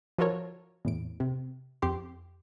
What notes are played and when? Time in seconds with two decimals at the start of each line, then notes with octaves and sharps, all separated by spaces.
0.18 F3 F4 F#4 A4 A#4 C#5
0.85 E2 A2 D7
1.20 C3
1.82 F2 G4 C6